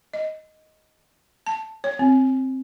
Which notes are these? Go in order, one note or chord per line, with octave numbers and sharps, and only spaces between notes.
D#5
A5
C#5
C4